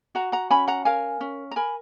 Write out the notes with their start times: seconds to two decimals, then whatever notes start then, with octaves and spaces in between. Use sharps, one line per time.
0.15 F#4 F#5 A#5
0.32 F#5 A#5
0.50 C#4 G#5 B5
0.67 F#5 A#5
0.85 A#4 F5 G#5
1.21 C#4
1.51 A#5
1.56 A#4 G#5 B5